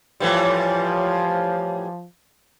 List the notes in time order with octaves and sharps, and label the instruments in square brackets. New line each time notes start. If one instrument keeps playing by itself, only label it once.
[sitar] A2 E3 G3 [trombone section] F3